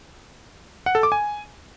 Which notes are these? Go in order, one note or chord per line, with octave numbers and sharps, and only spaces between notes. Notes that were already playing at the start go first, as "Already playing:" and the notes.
F#5
A4
D6
G#5